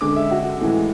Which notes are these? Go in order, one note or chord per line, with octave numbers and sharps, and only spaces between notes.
D3 G#3 D6
E5
F#4
A2 E3 G#3